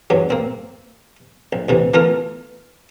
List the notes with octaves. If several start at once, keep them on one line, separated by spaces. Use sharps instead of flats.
E2 G2 F#3
A#3 C4
A#1
D2 C3 E3
E3 A3 B3 F4 A#4